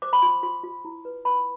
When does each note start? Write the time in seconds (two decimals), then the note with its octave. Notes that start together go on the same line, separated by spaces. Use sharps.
0.02 C5 D6
0.13 B5
0.22 F4 C6
0.43 F4 C6
0.64 F4
0.85 E4
1.05 B4
1.25 B4 B5